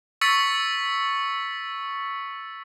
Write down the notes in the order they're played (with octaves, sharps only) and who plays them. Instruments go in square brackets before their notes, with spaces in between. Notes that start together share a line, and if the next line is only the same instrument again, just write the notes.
[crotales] C#6 E6 A6 B6 C#7